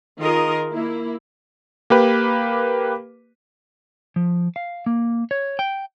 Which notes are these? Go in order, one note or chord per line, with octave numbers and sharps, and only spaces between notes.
D#3 F4 G#4 A#4 D#5
A#3 E4
A#3 G4 B4
F3
F5
A#3
C#5
G5